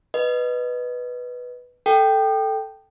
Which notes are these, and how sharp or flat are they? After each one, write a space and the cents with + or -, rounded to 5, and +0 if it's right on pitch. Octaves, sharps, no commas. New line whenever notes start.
B4 +0 D#5 -10
A4 +0 G5 +0